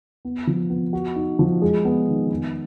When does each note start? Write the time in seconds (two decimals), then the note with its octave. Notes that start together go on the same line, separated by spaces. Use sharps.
0.25 B3
0.47 F3
0.70 B3
0.93 F#4
1.16 D#4
1.39 F3
1.62 G#3
1.85 B3
2.08 D#3
2.30 B3